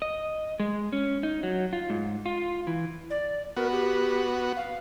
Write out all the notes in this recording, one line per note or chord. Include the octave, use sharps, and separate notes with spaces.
D#5
G#3
C#4
D#4
F#3
F4
G#2
F4
E3
D5
B3 F#4 A#4
G4
F5